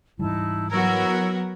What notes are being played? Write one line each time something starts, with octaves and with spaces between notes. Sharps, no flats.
G#2 E3 G3 D#4 E4 A5
F#3 B3 E4 F#4 A#4 E6 G#6